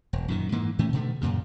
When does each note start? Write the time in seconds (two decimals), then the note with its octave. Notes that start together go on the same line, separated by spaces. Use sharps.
0.13 E1
0.28 F#2 A#2 D#3
0.52 G#2 E3 A#3
0.79 A2 E3 A3 C#4
0.93 B2 D3 D#3 A3
1.21 F#2 A#2 C#3